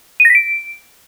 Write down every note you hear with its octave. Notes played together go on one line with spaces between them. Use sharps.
D#7
A#6
B6
D7